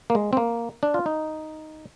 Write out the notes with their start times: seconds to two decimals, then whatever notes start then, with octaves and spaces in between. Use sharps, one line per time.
0.10 A#3
0.15 G#3
0.33 C4
0.37 A#3
0.83 D4
0.94 F4
1.06 D#4